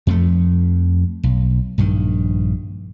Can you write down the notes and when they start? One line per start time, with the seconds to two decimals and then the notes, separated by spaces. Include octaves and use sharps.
0.07 F2 F3 A3
1.23 B1
1.78 A#1 G2 D#3